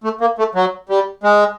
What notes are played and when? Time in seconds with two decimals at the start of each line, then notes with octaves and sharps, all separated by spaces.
0.04 A3
0.21 A#3
0.38 A3
0.55 F#3
0.89 G3
1.23 G#3